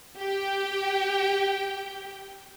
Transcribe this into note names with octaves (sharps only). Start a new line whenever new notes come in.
G4 G5